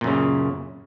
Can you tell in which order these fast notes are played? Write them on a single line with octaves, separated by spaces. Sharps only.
A#2 F#2 C#3